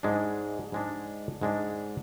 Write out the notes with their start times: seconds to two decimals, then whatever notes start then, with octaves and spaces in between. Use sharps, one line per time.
0.03 G#2 G#3 D4
0.72 G#2 G#3 D4
1.41 G#2 G#3 D4